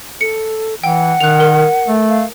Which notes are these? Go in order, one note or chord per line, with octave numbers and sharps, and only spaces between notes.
A4 C#7
E3 F#5 G5
D#3 F#6 F7
A#4
A3
F5